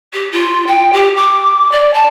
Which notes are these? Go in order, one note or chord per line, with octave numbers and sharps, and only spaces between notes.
G4
F4
G5
G4
D6
D5
A5